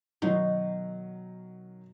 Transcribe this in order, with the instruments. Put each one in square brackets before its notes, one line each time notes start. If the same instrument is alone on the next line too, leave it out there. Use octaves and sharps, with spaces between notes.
[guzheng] B2 D#4 C6 [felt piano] D#3 F#3